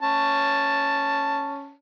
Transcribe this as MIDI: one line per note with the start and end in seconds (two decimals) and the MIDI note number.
0.02 1.72 61
0.02 1.72 81